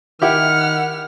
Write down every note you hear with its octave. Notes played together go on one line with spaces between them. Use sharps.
D#3 E4 G4 F#5 F6